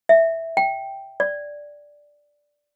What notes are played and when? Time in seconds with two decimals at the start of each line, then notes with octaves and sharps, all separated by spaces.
0.09 E5
0.57 G5
1.20 D5